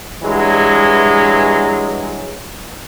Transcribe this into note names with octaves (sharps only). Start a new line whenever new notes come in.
G2 E3 F#3 G#3